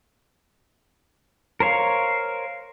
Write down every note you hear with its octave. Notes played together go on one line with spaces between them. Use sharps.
A#4 C5 C#5 F5